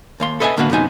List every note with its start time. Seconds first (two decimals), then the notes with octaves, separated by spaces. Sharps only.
0.20 D#2 F5 C6
0.40 A4 B4 D#5 E5 F#5 G#5
0.57 A2 D3 A#3 B3 F#4 B4
0.70 F#2 C3 B3 D#4 G#5